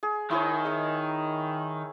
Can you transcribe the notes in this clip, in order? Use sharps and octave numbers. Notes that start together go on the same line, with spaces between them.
G#4
D#3 E4 G#4 C#5
G#3 E5 C#6